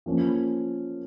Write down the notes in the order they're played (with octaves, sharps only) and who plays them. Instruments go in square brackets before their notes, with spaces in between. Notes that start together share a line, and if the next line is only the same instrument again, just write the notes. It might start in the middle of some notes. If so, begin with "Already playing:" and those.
[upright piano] F3 A#3 C#4